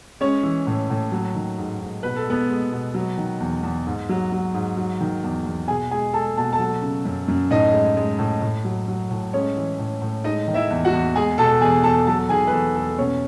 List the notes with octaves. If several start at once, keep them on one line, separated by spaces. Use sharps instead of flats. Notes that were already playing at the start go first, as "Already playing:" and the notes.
G#3 C#4 C#5
E3
A2
A2
F#3
D#3
G#2
G#2
B2 B4
A4
G#3 B3 B4
G#3
B2
F#3
D#3
E2
E2
G#2
F#3
F#3
G#2
F#3
D#3
E2
E2
B2 G#4 G#5
G#3 G#4 G#5
G#3 A4 A5
B2 A5
A4 A5
F#3
C#3
F#2
F#2
A2 D#4 D#5
G#3
G#3
A2
A2
F#3
F#3
A2
G#3 C#4 C#5
E3
A2
A2
G#3 D#4 D#5
D#3
E4 E5
E2
F#4 F#5
E2
G#3 G#4 G#5
B2 A4 A5
E2 G#4 G#5
E2 A4 A5
F#3 A4 A5
D#3 G#4 G#5
B4
E2 A4
E2 A4
B2 C#4 C#5